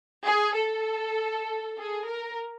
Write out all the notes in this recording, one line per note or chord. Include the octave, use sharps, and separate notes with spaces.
G#4
A4
G#4
A#4